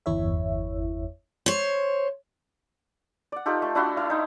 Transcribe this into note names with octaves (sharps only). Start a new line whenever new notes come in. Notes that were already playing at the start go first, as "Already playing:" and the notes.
G1 E2 E4 C#5 E5
C5 C#5
D5 F#5
D#4 F4 G4 A4
A3
D4 E4 F#4 C6
E4 F5
D#4 G5